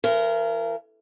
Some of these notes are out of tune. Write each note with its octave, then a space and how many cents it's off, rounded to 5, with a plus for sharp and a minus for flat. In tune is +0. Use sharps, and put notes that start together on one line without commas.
E3 +45 A#4 -10